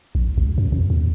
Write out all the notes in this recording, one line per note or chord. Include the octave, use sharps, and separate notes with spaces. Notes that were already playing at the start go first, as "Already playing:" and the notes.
A#1
C#2
F#2
F2
D#2